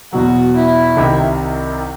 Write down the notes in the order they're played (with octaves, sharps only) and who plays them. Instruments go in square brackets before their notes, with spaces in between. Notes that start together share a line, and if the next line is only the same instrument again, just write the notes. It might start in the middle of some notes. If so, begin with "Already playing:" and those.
[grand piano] E2 B2 F#3 [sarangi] F#4
[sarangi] E4
[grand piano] C2 C3 D#3